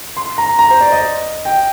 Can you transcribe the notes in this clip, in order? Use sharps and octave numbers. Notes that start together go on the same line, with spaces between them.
C6
A#5
A#5
C5
D5
D#5
G5